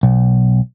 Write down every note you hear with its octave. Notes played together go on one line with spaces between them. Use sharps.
B1